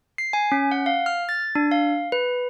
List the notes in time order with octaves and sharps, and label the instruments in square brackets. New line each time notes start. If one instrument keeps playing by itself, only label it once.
[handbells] C7
G#5
C#4
F#5
F5
F6
A6
D4
F5
B4